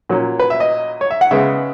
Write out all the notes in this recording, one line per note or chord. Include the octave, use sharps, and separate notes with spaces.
A#2 F#3 C#4
B4
E5
D#5
C#5
E5
F#5
C#3 G#3 B3 E5